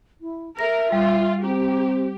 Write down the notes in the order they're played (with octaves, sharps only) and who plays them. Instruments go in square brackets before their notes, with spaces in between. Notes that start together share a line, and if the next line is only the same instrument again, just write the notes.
[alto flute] E4
[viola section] A#4 [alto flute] E5 [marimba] A#6
[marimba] G3 [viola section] F4
[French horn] C4 [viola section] G4 [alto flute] A#5